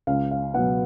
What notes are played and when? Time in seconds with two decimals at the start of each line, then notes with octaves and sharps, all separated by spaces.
0.07 C#2 F5
0.31 F5
0.54 B2 F#3 B3 F#5